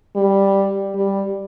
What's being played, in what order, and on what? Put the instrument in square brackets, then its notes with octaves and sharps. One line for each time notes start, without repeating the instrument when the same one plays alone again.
[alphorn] G3
G3